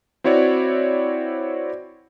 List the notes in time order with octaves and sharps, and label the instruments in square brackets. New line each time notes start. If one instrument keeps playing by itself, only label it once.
[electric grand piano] C4 E4 F#4 C#5 D5